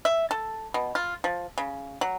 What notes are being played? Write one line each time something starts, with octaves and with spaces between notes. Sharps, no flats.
E5
A4
B2
F4
F3
C#3
F#3